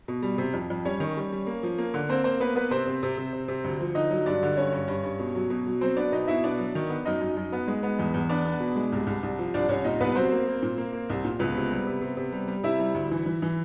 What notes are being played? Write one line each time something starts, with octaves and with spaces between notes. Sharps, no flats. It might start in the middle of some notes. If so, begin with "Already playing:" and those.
B2
G3
C3
F2
F2
G3 C#4 C#5
D#3
G3
G3
A#3
F3
A#3
D3
A#3 C4 C5
A#3 C4 C5
A#3 B3 B4
A#3 B3 B4
C3 C4 C5
C3
C3
C3
C3
C3
D2
F3
D3 D#4 D#5
F#3
G2 D4 D5
D3
G2 C#4 C#5
G2
G2
G2
B2
F#3
B2
F#3
F#3 C4 C5
B3 D4 D5
B2 D#4 D#5
B2 E4 E5
B3 D4 D5
F#3
D#3
B3
F#2 D#4 D#5
F#2
F#2
B3
G#3
B3
E2
E2
B3 D4 D5
B3
B2
G#3
C2
C2
C2
F3
C2 D4 D5
C2 C#4 C#5
A#2 D#4 D#5
C2 B3 B4
F#3 C4 C5
A#3
A#3
A#2
A#3
A#3
C2
A#2
C#2 B3 B4
C3
G3
C3
C3
C3
G3
G3
C3 E4 E5
G3
D2
E3
E3
E3